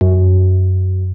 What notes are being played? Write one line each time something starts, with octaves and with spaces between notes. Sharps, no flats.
F#2